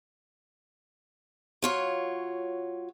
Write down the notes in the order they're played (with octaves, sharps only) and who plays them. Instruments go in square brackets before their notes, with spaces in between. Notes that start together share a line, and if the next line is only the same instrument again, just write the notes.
[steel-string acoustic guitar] F#3 F4 C#5